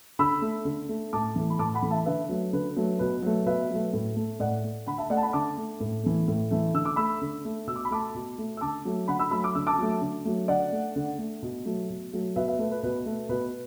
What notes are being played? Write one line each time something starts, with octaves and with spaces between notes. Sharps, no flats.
D3 B5 E6
A3
D3
A3
A2 A5 D6
E3 A3
B5
A2 A5 D6
F#5 B5
E3 A3
E5 A5
D3 B4 E5
F#3 A3
D3 B4
F#3 A3
B2 B4
F#3 A3
B2 B4 E5
F#3 A3
A2
A3
A2 D5 F#5
A3
D3 F#5 B5
E5 A5
A3 D5 F#5
A5
F#5 B5
D3 A5 D6
A3
A2
E3 A3
A2
E3 A3
D3 E6
D6
A3 B5 E6
D3
A3
B2 E6
D6
B5
A3 A5 D6
B2
A3
E6
D3 A5 D6
F#3 A3
D3 F#5 B5
B5 E6
F#3 A3 B5 E6
D6
D3 E6
A5 D6
F#3 A3
D3
F#3 A3
D3 D5 F#5
A3
D3
A3
B2
F#3 A3
B2
F#3 A3
B2 B4 E5
B4 E5
A3 B4
B4
B2 B4
A3
B2 B4